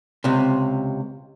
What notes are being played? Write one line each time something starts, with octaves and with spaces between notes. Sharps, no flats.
C#2 C3